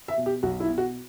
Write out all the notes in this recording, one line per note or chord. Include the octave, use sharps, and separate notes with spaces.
E5
B2
G4
B1 F#4
E4
B2
F#4